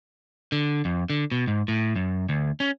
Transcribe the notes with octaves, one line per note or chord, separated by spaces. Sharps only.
D3
F2
D3
B2
G#2
A2
F#2
D2
C#4